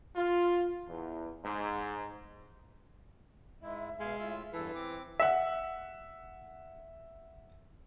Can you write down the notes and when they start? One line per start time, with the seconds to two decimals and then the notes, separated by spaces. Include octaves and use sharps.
0.16 F4
0.88 E2
1.45 G#2
3.62 G#2 G#3 E4 E5
3.99 B2 G#3 F5
4.20 A2 F4 E6
4.53 E2 G2 E3 A4
4.75 C4 D6
5.20 E5 F#5